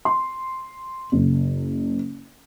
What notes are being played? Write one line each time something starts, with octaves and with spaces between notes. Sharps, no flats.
C6
F#1